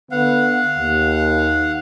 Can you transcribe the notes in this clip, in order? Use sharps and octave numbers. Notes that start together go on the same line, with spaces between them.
D3 B3 F5 F#5
D#2